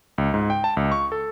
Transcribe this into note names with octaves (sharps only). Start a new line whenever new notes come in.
C#2
G#2
G5
A5
C#2
C#6
A4